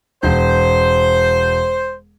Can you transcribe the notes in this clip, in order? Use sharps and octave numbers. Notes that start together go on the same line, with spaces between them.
E1 C5